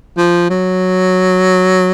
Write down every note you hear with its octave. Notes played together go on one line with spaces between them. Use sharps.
F3
F#3